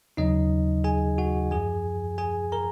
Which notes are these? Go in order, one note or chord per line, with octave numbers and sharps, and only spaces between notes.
D#2 C#3 F#3 D#4 D#5
G#4 G#5
F#4 F#5
F#2 F3 G#4 G#5
G#4 G#5
A#4 A#5